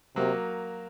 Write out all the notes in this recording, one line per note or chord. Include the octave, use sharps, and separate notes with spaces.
C3 F#3 A#3